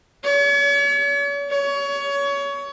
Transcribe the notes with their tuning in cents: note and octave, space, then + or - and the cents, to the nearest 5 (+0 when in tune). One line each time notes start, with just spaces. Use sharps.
C#5 +40
C#5 +25